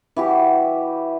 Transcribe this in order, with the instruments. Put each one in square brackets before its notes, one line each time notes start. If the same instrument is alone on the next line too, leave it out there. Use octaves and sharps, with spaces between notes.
[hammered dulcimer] E3 F#4 G4